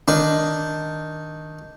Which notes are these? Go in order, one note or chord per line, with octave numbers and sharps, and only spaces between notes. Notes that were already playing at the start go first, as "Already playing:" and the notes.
D#3 D4